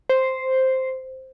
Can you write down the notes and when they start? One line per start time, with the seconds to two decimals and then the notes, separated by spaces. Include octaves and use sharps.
0.09 C5